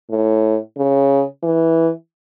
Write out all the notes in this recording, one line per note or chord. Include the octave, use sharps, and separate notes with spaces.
A2
C#3
E3